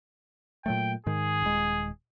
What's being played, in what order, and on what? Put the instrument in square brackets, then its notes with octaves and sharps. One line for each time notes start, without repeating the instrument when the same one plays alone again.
[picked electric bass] A#2 F#3 A3 [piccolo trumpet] G5
[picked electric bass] G#2 D#3 [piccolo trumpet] G#4
[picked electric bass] D#1 G#3